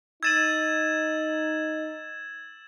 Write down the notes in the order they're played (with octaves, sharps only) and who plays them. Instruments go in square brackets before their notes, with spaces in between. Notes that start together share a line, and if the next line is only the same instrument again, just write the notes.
[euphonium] D#4 [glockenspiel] E6 A6 D#7 [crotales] G#6 E7 F#7